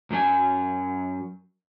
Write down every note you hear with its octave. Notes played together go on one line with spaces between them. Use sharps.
F#2 F#3 G4 G#5